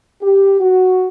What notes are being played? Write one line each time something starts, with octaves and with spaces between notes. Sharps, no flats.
G4
F#4